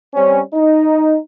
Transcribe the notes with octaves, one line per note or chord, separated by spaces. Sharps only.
G3 C4 C#4
D#4